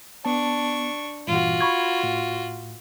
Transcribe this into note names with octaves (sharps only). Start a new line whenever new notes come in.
B3 D4 A5 C#6
G2 A#2 E3 F4 F#4
B5 C#6 G#6
A2